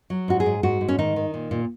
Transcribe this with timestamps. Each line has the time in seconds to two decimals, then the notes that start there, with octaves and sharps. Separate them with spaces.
0.10 F#3
0.28 G#2 F#4
0.40 G#4
0.46 G#2
0.63 G#2 F#4
0.81 G#2
0.88 C#4
0.98 D#3 D#4
1.16 D#3
1.34 A#2
1.51 A#2